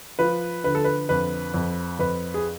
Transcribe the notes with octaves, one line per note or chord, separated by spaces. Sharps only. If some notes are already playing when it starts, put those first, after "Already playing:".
F3 B4
D3 B4
A4
B4
F2 B4
F2
F2 B4
G#4